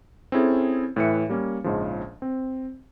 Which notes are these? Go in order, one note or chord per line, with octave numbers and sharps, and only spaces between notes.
C4 C#4 E4 G#4 A4
A2 E3 B4 E5 C#7
G3 A#3 C#4
A#1 G#2 C#3 F3
C4